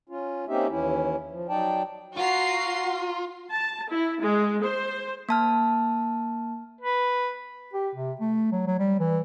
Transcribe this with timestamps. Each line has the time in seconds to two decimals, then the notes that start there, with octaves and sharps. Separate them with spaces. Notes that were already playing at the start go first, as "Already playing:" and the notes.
0.09 C#4 F4
0.48 A#3 C4 C#4 D#4 G4 E5
0.69 D#2 E3 C#4 E4
1.31 F3
1.49 F#3 D#4 D5 G5 A5
2.17 F4 F#4 F#5 A#5 C7
3.51 A5
3.90 E4
4.21 G#3
4.63 C5
5.29 A#3 A5 F6
6.81 B4
7.73 G4
7.95 C3
8.20 A3
8.52 F#3
8.67 F#3
8.79 G3
8.99 E3